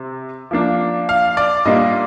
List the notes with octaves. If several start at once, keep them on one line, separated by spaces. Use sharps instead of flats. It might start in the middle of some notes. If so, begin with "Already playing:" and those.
Already playing: C3
F3 A#3 D4
F5
D5
A#2 G3 A#3 D4 D#5